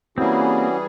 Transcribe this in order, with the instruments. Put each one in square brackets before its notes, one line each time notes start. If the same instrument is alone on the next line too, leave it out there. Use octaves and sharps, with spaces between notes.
[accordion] E3 G3 G#4 [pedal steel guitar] A#3 C4 [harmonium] C#4 E4 F#4